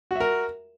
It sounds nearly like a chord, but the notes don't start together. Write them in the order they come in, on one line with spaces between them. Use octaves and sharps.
F#4 E5 A#4